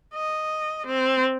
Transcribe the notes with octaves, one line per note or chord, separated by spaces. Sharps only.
D#5
C4